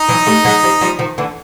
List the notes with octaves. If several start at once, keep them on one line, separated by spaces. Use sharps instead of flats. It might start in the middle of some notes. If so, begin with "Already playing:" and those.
Already playing: D#4 D#5
E3 F#3
G3 A3
F#3 G#3
F3 G3
F3 G3
D#3 F3
D3 E3